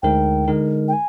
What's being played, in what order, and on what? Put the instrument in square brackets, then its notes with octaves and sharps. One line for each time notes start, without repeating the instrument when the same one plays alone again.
[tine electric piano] D2 D3 G#3 D#4 A#4 [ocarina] G5
[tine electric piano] D3 G#3 D#4 A#4
[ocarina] G5
G#5